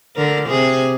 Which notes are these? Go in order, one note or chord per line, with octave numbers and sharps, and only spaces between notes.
D3 A#4
C3 G#4